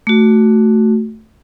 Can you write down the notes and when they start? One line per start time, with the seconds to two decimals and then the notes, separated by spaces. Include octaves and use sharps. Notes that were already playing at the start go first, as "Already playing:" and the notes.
0.07 A3 F#4